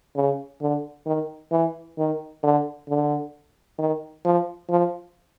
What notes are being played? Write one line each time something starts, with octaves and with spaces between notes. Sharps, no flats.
C#3
D3
D#3
E3
D#3
D3
D3
D#3
F3
F3